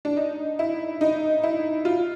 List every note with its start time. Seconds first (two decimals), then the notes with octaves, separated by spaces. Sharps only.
0.05 D4
0.17 D#4
0.59 E4
1.01 D#4
1.43 E4
1.85 F4